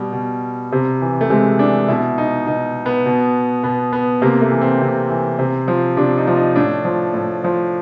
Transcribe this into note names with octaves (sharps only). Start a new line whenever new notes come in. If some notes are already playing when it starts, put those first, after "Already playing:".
Already playing: B2 G3
B2
C3
E3
A3
C3 G#3
E3 D4
B2 E4
D#4
B2 D#4
B3
B2
B2 B3
B3
C3 A#3
A3
E3
C4
C3
E3
C3
F3
C3 D4
D#4
F3
D#4
A2 D4
F3
A2
F3